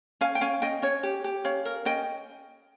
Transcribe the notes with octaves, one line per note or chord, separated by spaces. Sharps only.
C#4 F5 G#5
G5
C#4 F5 G#5
C#4 D#5 G5
C#4 C#5
G4
G4
C#4 C#5 F5
A#4
C#4 D#5 G5